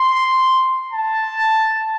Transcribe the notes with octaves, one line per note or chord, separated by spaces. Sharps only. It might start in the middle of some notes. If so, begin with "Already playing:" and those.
Already playing: C6
A5